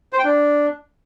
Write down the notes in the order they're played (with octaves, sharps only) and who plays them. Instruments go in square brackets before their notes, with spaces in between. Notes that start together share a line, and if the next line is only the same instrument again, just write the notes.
[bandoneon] C5
G5
D4